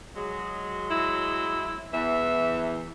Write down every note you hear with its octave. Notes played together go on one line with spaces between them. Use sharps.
F#3 G#3
E4
E2 E3 E5